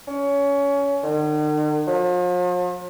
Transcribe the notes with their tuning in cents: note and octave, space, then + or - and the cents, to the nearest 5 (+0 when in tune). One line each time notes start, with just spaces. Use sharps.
C#4 +25
D#3 -45
F3 +45